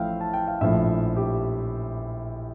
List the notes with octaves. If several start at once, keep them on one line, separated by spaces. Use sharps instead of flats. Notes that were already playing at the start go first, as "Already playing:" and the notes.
Already playing: A1 A2 F3 E5 F5 G5
A5
G5
F5
A#1 A2 F3 E5
G4